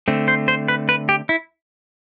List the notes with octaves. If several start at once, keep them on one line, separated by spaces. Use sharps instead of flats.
D3 A3 C4
C5
C5
B4
B4
G4
E4